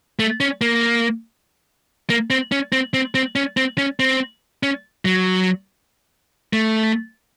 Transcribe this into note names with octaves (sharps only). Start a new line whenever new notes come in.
A3
C#4
A#3
A#3
C4
C#4
C4
C4
C4
C#4
C4
C#4
C4
C#4
F#3
A3